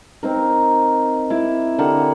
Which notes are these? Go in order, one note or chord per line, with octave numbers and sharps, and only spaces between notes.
C4 D#4 A#4
E4 D6
D3 G4 A#4 F#5